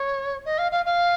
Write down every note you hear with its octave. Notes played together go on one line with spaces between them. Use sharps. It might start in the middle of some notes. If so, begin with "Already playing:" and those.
Already playing: C#5
D#5
F5
F5
F5